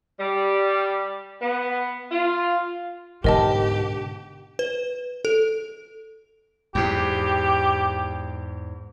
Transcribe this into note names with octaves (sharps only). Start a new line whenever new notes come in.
G3
B3
F4
G#2 B2 D3 G4 A#4 D#5 A5
B4
A4
E2 G#2 G4